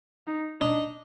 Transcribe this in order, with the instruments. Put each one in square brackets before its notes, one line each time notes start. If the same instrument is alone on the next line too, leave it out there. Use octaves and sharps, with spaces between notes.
[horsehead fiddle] D#4
[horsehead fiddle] D4 [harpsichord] D#4